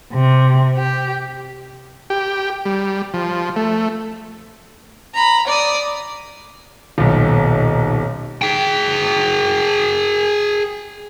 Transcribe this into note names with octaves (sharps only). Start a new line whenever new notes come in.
C3
G4
G4
G3
F3
A3
A#5 B5
D5 D#6
D#1 B1
G#4 G5